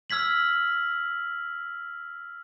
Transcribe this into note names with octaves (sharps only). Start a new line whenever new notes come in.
E6 F6 G#6 B6 F#7